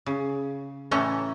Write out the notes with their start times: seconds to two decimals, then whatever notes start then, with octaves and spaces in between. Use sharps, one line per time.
0.06 C#3
0.91 A2 E3 A3 C#4 A#5